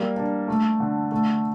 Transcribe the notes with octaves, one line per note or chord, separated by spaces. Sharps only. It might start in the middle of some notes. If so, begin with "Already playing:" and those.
Already playing: G3 A#3
D4
A3
D3
A3